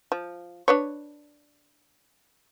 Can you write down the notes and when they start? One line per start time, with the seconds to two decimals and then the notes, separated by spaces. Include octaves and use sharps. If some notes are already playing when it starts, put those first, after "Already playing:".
0.12 F3
0.68 D4 B4 C#5